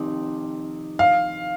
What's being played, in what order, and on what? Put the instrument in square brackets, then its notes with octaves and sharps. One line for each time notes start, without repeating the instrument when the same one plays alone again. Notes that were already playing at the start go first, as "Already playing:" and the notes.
Already playing: [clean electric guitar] F2 C3 D#3
[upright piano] F5